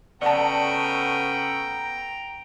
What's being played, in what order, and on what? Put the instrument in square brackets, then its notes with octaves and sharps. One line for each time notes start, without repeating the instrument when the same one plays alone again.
[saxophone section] C#3 A3 B3 [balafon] D5 F#5 A5 [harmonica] G5 A#5